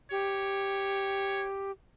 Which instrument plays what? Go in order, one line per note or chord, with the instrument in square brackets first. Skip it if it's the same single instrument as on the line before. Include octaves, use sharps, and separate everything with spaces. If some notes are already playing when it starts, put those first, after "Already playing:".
[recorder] G4 [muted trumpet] C#5